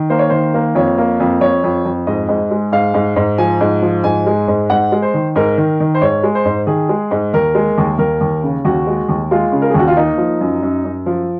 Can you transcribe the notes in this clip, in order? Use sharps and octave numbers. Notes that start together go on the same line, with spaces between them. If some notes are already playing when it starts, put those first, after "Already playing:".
Already playing: D#3
A#3 C5
C#5
D#3 C5
A#3
F2 C#5
A#3
F2
F2 C#5
F2
F2
G#2 D#5
G#2
G#3
G#2 F5
G#2
G#2
F3 G#5
G#2
F3
G#2 G#5
G#3
G#2
G#2 F#5
G#3
C5
D#3
G#2 A#4
D#3
D#3
C5
G#2 C#5
G#3
C5
G#2
D#3 G#4
G#3
G#2
D#2 A#4
G#3
D#2
D#2 A#4
D#2
C#3
D#2 F#4
G#3
D#2
G#3 F4
C#3
A#4
G#4
D#2 F#4
F4
A#3 D#4
F3
F#2
F#2
F#2
F3